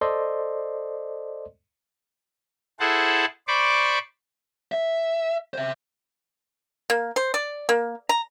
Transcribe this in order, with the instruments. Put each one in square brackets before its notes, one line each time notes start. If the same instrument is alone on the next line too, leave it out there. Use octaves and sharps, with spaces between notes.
[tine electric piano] A4 C5 D5 D#5 C6
[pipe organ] E4 G#4 A4 C5 F#5 A5
C5 D5 B5 C#6 D6
[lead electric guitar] E5
C5 E5
[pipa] A#3
C5
D5
A#3
A#5